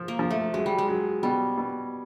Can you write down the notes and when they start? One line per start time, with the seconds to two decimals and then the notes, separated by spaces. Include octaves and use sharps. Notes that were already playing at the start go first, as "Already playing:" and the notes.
Already playing: F3
0.08 A#3
0.19 F3
0.30 A3
0.54 F#3 G#3
0.66 G3
0.78 G#3
0.88 F#3
1.23 B2 G3
1.58 B2